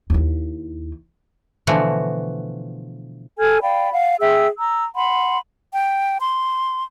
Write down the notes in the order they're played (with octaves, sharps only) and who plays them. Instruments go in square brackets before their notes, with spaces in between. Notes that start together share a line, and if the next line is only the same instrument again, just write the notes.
[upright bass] D#2 E4
[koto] B2 D3 E3 F3 A3 F#4
[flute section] A4 G#5 F6 G#6
D5 F5 G5 B5
F5 F#5
G#4 E5 G5 E6
A#5 E6
F#5 B5 C6
[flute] G5
C6